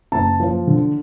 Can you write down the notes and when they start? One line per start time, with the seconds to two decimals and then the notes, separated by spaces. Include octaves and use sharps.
0.12 F#1 A5
0.40 F3
0.67 D3